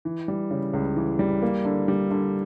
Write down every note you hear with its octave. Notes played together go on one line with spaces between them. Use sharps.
E3
G3
C#3
C#2
E3
G3
A#3
D3
G3
D3